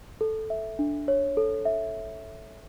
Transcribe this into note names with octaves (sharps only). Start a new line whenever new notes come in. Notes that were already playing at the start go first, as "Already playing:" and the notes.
A4
E5
D4
C#5
A4
E5